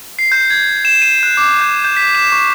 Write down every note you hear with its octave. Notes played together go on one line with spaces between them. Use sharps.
C7
G6
G#6
E7
D#7
F#6
D6
G6
G6
B6
E7
C#6